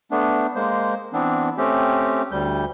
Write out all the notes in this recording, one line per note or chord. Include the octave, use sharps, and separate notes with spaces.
A3 B3 D4
G#3 A#3 C5
E3 B3 C4 D4
A3 C4 C#4 G4
D2 G3 G6